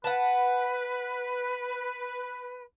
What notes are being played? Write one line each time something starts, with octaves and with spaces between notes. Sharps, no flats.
B4 F#5 A5